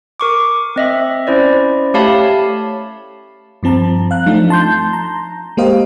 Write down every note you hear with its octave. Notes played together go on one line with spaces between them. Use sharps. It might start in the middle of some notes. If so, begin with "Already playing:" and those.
A#4 C#6 D6
C4 D#5 E5
C#4 E4 C5 D5
A3 G4 C#5 F5 A5 B5
G2 F3 C4 A5 A#5
F5 F#6
F3 A3 C4 D4 D#4
A5 C6 G6
A#5
G#3 A#3 G4 C5 D#5 F5